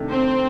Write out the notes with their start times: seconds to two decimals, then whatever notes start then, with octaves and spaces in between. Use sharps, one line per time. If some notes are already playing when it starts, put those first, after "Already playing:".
Already playing: C3 D#3 A3 D4
0.11 C4